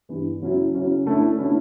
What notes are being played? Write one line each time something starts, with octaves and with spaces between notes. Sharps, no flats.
G2 E3 B3
C#3 F#3 C#4 E4
C#3 F#3 C#4 E4
D3 A3 C#4 E4
D3 A3 C#4 E4